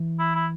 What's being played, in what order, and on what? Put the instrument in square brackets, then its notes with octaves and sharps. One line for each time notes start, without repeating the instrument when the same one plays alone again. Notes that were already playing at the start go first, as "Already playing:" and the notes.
Already playing: [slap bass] E3
[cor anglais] E4
E4